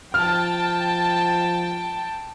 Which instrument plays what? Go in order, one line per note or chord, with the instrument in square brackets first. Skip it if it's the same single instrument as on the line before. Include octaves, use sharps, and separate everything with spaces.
[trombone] F3 [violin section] G5 A5 [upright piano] F6